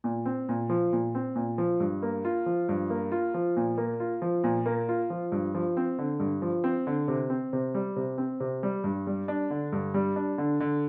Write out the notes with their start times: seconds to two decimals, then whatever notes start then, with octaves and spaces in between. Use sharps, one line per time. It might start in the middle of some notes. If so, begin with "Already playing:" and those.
0.04 A#2
0.25 C4
0.49 A#2
0.70 F3
0.93 A#2
1.15 C4
1.36 A#2
1.58 F3
1.80 G2
2.02 A#3
2.25 F4
2.46 F3
2.69 G2
2.90 A#3
3.12 F4
3.34 F3
3.57 A#2
3.78 A#3
4.00 F4
4.22 F3
4.44 A#2
4.66 A#3
4.89 F4
5.10 F3
5.32 G2
5.55 F3
5.77 C4
5.99 D3
6.20 G2
6.42 F3
6.64 C4
6.87 D3
7.08 C3
7.30 C4
7.53 C3
7.74 G3
7.96 C3
8.18 C4
8.40 C3
8.63 G3
8.84 G2
9.07 G3
9.28 D4
9.50 D3
9.73 G2
9.94 G3
10.16 D4
10.38 D3
10.60 D3